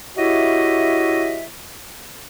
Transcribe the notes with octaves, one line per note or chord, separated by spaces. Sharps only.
E4 F#4 G4 C#5 D#5 E5